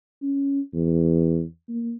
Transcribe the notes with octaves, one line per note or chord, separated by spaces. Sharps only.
C#4
E2
A#3